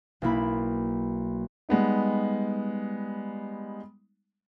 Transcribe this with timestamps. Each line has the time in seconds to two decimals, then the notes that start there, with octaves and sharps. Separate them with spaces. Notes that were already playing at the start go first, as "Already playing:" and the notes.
0.22 B1 A#3 E4 B5
1.69 G3 G#3 B3 D#4